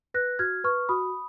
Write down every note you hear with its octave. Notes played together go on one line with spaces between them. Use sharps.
B4 F#6 A#6
F#4 F6 G#6
B4 C#6 F6
F#4 B5 D#6